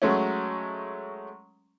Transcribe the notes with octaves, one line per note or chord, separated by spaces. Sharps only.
F#3 G#3 A3 C#4